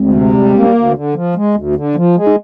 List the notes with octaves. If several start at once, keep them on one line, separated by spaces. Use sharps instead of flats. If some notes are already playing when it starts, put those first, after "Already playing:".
Already playing: D2 G#3 C4
C3
G3
A#3
D2
D3
F3
G#3
D2
D3
F3
G#3
D#4